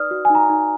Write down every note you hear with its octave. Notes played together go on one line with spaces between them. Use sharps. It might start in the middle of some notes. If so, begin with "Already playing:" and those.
Already playing: D#4 B4 D5 D#6 F6
F#4
G#5
D#4 A#5
D#4